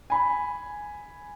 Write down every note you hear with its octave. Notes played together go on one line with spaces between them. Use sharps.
G#5 B5